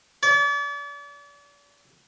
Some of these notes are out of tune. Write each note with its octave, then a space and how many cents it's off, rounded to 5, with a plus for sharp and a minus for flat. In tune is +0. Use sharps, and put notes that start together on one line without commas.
D5 -40